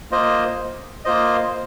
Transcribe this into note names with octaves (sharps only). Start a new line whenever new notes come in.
A#3 F4 C5 D#5
A#3 F4 C5 D#5